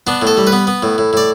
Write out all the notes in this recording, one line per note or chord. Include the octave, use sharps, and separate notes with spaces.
B3 D4
A2
A4
G3
B4
B3
B3
A2
A2
A2 D5